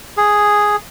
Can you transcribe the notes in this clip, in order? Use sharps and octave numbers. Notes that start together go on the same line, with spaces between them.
G#4